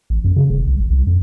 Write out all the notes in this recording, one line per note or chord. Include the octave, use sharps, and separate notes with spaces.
A1
F#2
C#3
F1
C2
G#1
C2
F2